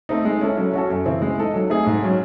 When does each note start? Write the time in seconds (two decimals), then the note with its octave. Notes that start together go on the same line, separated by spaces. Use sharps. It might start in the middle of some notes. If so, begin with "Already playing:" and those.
0.09 A3 C4 D#4
0.25 G#3
0.41 C#4 E4 A4
0.57 F#3
0.73 C#4 F#4 A4
0.90 F#2
1.06 C#3 E3 C4 E4
1.22 G#3
1.38 D#4 A4 D#5
1.54 F#3
1.70 A3 C4 D#4 G#4
1.86 G#2
2.02 F#3 C#4